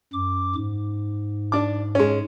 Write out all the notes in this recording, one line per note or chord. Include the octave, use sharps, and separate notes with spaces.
F#2 D6
G#2
D4 D6
G#3 C#4